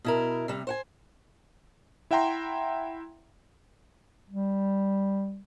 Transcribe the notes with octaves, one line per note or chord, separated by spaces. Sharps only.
B2 E4 A#4
C3 G3
C5 F#5 G#5
E4 E5 F#5 G5 A#5 C6
G3